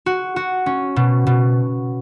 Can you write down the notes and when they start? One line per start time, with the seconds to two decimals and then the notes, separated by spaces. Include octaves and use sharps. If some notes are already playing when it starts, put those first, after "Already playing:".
0.06 F#4
0.36 F#4
0.66 C#4
0.96 B2
1.27 B2